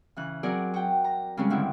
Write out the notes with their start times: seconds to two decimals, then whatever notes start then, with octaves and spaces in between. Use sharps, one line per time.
0.16 C#3 E3 F#6
0.43 F#3 C4 G#4 A#4 D5 F#5
0.74 F#4 G5
1.04 A#5
1.37 C#3 G3 G#3 C4 C#4
1.50 G2 D3 D#3 C4 E4